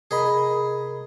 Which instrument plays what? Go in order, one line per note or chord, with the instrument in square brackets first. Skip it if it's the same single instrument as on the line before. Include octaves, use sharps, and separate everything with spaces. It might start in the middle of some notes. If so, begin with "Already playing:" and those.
[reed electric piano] C3 A#4 B5 [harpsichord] G#4 D#5